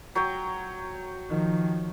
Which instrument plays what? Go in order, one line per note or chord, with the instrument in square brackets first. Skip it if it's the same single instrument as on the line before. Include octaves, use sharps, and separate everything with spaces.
[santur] F#3 C#5 G5
[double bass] D#3 F3